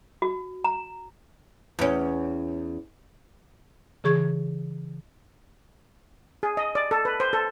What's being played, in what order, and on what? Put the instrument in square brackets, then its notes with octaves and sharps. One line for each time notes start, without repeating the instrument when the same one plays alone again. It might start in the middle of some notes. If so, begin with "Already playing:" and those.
[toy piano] F#4
A#5
[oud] E2 C#4
[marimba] C#3 E3 G#4 C#6 G#6
[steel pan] G#4
D#5
D5
A4
B4
C5
A4